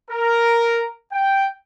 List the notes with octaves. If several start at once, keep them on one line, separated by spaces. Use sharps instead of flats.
A#4
G5